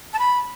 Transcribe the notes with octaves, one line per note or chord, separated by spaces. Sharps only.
A5
B5